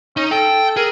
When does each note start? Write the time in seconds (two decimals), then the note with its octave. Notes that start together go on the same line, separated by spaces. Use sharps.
0.17 C#4 D#4
0.31 A4 G5
0.77 G#4 A#4